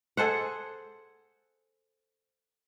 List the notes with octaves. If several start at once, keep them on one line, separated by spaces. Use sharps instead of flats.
G#4 A4 C5 F#5